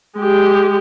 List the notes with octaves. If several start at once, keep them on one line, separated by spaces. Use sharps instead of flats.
G#3 G4